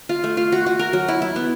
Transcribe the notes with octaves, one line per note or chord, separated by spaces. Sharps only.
F4
A3
F4
F#4
F#4
A#4
F#3
E4
E4
B3